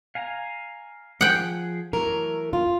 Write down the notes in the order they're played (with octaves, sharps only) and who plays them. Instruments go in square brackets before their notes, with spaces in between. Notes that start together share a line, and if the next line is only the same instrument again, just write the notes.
[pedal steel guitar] F5 G#5 A#5
[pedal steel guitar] F3 G#4 [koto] F#5 G5
[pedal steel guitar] E3 F#3 A3 [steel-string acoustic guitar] A#4
[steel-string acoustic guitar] F4